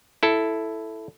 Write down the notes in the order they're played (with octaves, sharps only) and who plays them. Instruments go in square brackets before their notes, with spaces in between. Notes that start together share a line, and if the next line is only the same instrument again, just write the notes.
[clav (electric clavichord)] E4 A4